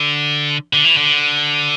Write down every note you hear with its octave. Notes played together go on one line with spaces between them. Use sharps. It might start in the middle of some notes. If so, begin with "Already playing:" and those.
Already playing: D3
D3
E3
D3